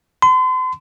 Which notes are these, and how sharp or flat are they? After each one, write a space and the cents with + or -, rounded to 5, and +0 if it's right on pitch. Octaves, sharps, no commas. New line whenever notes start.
C6 -40